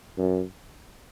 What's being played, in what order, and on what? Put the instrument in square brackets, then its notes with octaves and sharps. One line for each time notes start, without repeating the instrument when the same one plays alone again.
[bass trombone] F#2